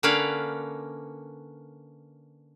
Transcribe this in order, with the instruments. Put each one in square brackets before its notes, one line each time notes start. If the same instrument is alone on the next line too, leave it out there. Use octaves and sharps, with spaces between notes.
[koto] D3 A#3 C#4 B4 D5 F5